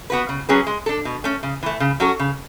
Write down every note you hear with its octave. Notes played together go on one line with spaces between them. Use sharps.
B3 F#4 B4
C#3
F#3 C#4 G#4 B4
G#3
D4 A4
B2
A3 C#4
C#3
E3 A3
C#3
F#3 C#4 F#4 A4
C#3